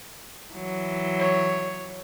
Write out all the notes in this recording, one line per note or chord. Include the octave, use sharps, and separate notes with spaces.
E3 F#3
C#5